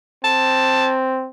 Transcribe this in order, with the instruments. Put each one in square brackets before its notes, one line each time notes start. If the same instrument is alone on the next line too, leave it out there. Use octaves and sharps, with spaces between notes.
[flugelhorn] C4 [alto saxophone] A5